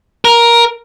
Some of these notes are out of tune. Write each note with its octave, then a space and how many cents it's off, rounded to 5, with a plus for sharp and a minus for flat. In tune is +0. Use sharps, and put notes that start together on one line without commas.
A#4 +10